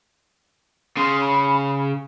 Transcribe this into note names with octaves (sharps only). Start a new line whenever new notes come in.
C#3 C6
B5